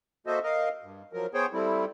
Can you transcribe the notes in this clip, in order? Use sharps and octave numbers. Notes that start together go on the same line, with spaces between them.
A#3 F#4 A4 C5 D#5 E5
A#4 D#5 F5
G2
F3 F#3 A#4
B3 G#4 C5 C#5 G5
G3 A3 C4 E4